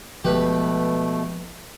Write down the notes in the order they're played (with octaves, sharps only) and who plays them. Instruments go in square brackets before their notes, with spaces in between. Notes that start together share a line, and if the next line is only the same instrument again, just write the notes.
[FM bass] F#1 [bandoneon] B2 A3 [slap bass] F3 G#3 [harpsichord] G4 B4